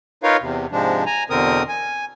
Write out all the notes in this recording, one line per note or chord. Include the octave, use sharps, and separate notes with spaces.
D#4 F4 A#4 B4 C#5 F5
E2 C3
G#2 C3 F3 G#3 D4
G#5 A#5
E2 B2 D3 C4 A#4 D#6
G#5